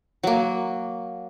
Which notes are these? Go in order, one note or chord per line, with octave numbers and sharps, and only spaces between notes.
F#3 A#3